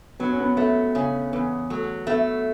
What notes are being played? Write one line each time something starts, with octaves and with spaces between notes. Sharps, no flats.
F#3 B3
C#4
B3
A3 B3
C#3 C#4
E2 B3
F#3 A3
A3 B3